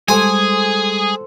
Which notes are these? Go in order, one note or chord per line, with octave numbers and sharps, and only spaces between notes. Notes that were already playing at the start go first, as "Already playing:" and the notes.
G3 G#3 G#4 A4 C5 F#5 G#5